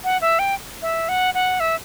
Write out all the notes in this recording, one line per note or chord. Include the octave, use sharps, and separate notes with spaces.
F#5
E5
G5
E5
F#5
F#5
E5